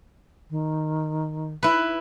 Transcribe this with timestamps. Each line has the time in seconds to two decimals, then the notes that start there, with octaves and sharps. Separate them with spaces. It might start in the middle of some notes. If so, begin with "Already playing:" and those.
0.50 D#3
1.63 E4 B4